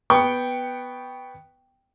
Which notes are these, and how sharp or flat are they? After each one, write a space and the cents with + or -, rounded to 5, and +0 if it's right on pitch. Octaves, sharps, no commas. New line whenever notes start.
B3 +0 G5 +0 C#6 +15